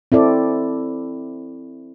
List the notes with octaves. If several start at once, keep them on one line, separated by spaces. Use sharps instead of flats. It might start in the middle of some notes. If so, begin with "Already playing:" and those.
C4 E4 A4 D5